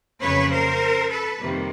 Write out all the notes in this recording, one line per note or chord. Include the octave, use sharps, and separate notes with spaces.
F2 C#3 F#3 A#3 B4 C#5
A#4 C5
A4 B4
F2 C3 D#3 G3 A#3